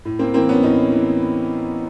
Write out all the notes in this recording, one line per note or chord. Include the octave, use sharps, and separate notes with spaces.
A2
A#3 C4
E3 A#3 C4
B3 C#4
A2 C#4 D#4
E3